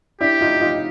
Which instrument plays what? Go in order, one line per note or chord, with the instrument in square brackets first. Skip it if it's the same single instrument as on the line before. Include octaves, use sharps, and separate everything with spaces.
[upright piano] D4 E4 [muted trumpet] G4
[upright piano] D#4 F4
D#4 F4